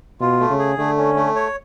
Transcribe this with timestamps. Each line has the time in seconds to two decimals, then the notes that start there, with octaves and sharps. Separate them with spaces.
0.21 B2 F4
0.39 A3
0.50 C#3
0.59 G#4
0.78 D3 A3
0.98 C#4
1.16 A3
1.36 C#5